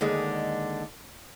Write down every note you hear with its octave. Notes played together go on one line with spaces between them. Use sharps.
D#2 D3 G#3